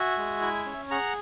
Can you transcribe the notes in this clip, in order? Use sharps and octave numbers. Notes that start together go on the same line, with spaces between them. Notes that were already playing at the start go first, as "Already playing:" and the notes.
Already playing: F#4 E5 G#5
G#3
E4
C#4
G#4 F#5 A#5